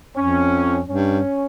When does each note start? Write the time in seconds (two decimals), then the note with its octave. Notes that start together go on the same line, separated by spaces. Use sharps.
0.16 F2 C#4
0.88 G2 C#4